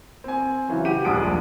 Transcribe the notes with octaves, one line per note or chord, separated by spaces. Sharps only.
C4 G#5
C#3 E3 F#3
G4 F#5 D#7
D#1 A#1 G#3 D4 D#6 D7